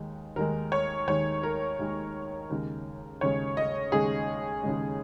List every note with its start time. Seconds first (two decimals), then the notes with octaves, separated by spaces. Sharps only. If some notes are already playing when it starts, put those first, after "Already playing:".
Already playing: D#2 D#3 G#3
0.36 D#2 D#3 G#3 A#4
0.72 C#5
1.07 D#2 D#3 G#3 C#5
1.43 A#4
1.79 D#2 D#3 G#3
2.50 D#2 C#3 G#3
3.21 D#2 C#3 G#3 C#5
3.57 D#5
3.92 D#2 C#3 G#3 G#4
4.63 D#2 C#3 G#3